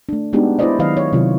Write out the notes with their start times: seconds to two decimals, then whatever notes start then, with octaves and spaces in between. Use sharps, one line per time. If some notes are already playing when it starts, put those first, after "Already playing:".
0.09 A3 D4
0.33 G#3 B3 D4 D#4 F#4 G4
0.59 E4 G#4 B4 C5 D5 D#5
0.79 D#3 F#3 B4 D#5 F5
0.97 C#5
1.13 C3 D#3 F#3 E4 F4